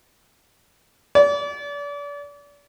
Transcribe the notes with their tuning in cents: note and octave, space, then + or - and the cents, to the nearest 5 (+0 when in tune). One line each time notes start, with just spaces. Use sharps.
D5 -35